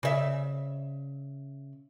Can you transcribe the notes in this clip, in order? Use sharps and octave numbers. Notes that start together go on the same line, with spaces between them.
C#3 E5